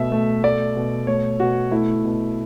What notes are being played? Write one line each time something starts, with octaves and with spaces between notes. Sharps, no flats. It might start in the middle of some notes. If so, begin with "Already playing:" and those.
Already playing: B2 A3 E5
A3
A3 D5
B2
A3 C#5
B2 F#4
A3 E4
B2